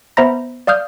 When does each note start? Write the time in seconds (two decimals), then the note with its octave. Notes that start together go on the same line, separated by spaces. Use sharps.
0.17 B3 C5 E5 A#5 B5 A#6
0.67 D5 F5 D#6 F6 G6